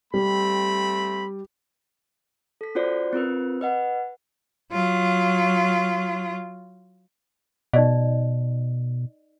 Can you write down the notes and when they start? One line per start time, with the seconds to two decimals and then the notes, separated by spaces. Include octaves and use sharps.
0.14 G3 A3 C4 B5
2.61 A4 B6
2.75 C#4 F4 F#4 C5 D5
3.13 C4 F4 A#4 B4
3.61 B4 D#5 F#5
4.71 F#3 F4
7.73 B2 D#4 D5 D#5